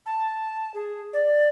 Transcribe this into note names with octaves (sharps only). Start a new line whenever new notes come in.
A5
G#4
D5